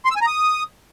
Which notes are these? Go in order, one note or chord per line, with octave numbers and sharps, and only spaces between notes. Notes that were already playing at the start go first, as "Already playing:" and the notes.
C6
E6
G#5
A#5
D#6